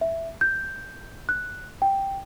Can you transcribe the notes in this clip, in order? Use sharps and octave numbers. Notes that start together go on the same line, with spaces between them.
E5
G6
F#6
G5